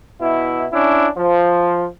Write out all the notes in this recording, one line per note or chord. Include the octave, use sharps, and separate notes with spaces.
B2 E4
C#4 D4 E4
F3